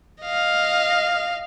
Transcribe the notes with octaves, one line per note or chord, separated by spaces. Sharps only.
D#5 F5